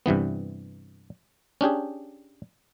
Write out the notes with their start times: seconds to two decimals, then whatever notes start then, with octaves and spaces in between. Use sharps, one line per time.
0.06 G2 C3 E3 B3
1.61 C#4 D4 G4 G#4